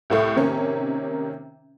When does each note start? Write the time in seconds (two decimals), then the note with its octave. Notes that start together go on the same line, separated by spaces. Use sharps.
0.10 C2 A2 A3
0.36 C3 D#3 A#3 C#4